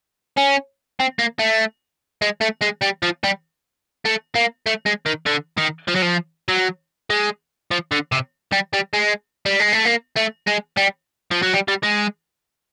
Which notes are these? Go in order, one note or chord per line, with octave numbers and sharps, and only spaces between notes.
C#4
C4
A#3
A3
G#3
A3
G#3
G3
F3
G3
A3
A#3
A3
G#3
D#3
D3
D#3
F3
F#3
F3
F#3
G#3
F3
D3
C3
G3
G3
G#3
G3
G#3
A3
A#3
A3
G#3
G3
F3
F#3
G3
G3
G#3